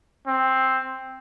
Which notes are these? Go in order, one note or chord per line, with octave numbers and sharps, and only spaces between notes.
C4